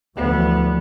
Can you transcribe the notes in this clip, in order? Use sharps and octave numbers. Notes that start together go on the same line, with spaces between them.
D2 E3 F3 G3 B3